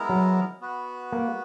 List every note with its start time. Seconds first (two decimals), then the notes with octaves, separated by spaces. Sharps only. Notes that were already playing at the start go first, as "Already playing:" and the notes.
Already playing: G#3 B3 E4 A#4
0.09 F#3
0.61 B3 F#4 B4
1.12 A#3